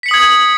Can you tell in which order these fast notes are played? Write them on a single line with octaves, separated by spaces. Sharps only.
B6 C#7 F#7 D#6 G#6